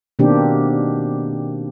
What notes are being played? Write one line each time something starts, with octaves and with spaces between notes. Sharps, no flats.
B2 D#3 A#3 C4 D4 G4